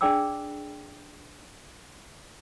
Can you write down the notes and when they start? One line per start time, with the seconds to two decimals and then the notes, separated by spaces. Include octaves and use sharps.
0.01 D4 G#4 D5 G5 D6 E6